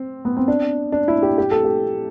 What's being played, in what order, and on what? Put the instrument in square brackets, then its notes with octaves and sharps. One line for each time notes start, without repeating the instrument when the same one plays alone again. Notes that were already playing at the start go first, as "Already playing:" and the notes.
Already playing: [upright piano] C4
B3
C4
D4
D4
E4
G4
G4
A4
G4